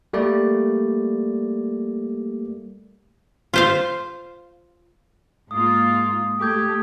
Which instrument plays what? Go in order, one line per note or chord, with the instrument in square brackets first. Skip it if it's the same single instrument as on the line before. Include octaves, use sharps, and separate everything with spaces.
[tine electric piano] G3 A3 A#3 D5
[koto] F4 C5 F5
[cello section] G#2 A#3 F4 [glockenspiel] D#6
[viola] A3 [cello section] G4 [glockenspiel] D6 G6 G#6